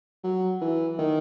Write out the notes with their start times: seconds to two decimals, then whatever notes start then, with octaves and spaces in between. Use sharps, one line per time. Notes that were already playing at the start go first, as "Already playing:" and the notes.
0.24 F#3
0.61 E3
0.99 D#3